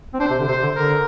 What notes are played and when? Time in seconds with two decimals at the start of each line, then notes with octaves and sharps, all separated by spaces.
0.14 C4
0.20 D4 C5
0.30 C3
0.40 D3
0.48 C3 C5
0.63 D3
0.77 D3 A#4